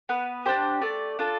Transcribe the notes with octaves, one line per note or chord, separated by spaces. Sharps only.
B3 B4
D4 G4 C5
A3 D5
D4 F4 A4